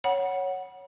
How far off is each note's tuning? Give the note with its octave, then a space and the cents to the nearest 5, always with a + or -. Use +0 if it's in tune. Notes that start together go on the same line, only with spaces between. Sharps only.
C#5 +0 F#5 +0 B5 -35